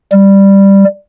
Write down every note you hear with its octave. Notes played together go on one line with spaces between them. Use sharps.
G3